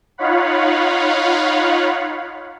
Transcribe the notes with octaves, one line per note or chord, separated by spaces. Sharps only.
D#4 F4 C#5 F5 F#5 B5